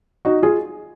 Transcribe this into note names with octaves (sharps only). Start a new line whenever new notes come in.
D#4 F#4
F4 G#4